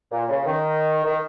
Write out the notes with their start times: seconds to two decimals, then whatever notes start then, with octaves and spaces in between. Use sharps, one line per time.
0.11 A#2
0.29 C#3
0.46 D#3
1.05 D#3